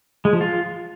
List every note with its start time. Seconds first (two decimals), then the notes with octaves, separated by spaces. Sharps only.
0.25 G#3
0.33 F3
0.41 F4